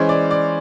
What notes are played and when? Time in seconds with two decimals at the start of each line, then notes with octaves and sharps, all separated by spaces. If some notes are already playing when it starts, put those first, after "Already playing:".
Already playing: E3 G#3 C#4 C5
0.09 D5
0.31 D5